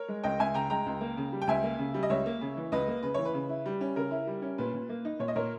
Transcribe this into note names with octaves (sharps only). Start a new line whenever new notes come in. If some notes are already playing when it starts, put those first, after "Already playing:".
Already playing: A#4 C#5
G#3
C#2 D#5 G5
C#2 E5 G#5
C#3 G5 A#5
G#3 G5 A#5
C#2
A#3
C#3
G3
G5
C#2 E5 G#5
A#3
C#3
G3
D#5
C#2 C#5 E5
A#3
C#3
E3
C#2 B4 D#5
A#3
C#3 B4
E3 C#5
B4
C#3
E4
G3
C#4
C#3 A#4
E4
G3
C#4
A#2 B4
A#2
A#3
D#4
A#2 C#5
D#5
A#2 A#4 C#5